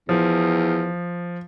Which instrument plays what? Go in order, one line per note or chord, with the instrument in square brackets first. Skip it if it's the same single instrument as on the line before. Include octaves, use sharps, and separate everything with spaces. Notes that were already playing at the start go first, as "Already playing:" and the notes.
[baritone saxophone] E2 [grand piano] F3